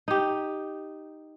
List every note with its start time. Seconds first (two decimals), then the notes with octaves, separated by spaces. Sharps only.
0.08 D#4 G4